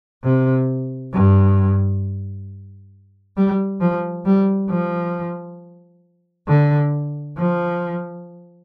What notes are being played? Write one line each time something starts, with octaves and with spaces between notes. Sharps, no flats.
C3
G2
G3
F3
G3
F3
D3
F3